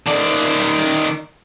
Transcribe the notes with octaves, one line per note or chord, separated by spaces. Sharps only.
D#3 D5